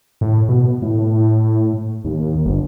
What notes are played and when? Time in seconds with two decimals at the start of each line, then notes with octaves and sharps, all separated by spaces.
0.21 A2
0.49 B2
0.82 A2
2.05 D#2
2.45 G1